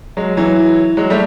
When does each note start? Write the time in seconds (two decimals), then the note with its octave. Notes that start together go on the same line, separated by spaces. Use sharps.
0.17 F#3 G#3
0.37 E3 F#3
0.97 F#3 G#3
1.10 G3 A3